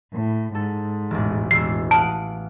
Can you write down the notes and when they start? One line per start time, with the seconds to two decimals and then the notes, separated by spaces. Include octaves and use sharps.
0.12 A2
0.55 G#2 A4
1.11 E1 A1
1.51 E1 E6 C7
1.91 F5 F#5 A5 D#6